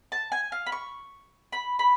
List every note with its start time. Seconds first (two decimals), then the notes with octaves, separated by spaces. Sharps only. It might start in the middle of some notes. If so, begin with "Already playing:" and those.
0.12 A5
0.32 G#5
0.52 F5
0.66 B5
0.72 C#6
1.52 B5
1.79 B5